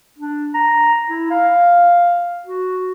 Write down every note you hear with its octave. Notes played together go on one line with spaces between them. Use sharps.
D4
A#5
E4
F5
F#4